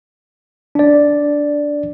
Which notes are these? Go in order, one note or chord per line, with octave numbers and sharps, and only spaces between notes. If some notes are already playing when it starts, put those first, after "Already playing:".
D4 D5